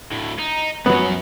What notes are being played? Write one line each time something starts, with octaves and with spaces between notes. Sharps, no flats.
D2 A2
D#4
F#2 F#3 B3 C#4